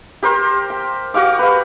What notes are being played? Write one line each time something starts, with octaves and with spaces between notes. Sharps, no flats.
G4 A#4 C5
G5
F#4 G4 F5 D6
B4 F5